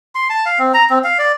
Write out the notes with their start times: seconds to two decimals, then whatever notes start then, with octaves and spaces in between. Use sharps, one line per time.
0.15 C6
0.30 A5
0.46 F5
0.59 C4
0.74 A#5
0.90 C4
1.04 F5
1.19 D5